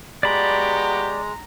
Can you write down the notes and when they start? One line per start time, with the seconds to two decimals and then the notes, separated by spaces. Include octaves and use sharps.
0.23 G#3 B3 F#4 G4 D5 A#5 B5